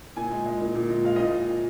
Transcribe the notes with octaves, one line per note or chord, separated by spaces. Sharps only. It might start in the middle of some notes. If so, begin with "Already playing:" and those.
A#2 G#5
G#3
G#3
A#2
A#2
G#3
G#3 F5
D#5
A#2